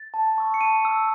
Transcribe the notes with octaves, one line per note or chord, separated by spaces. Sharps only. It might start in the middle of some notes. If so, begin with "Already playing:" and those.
Already playing: A6
A5
C#6 E6
C#7
A5 D#7
C#6 E6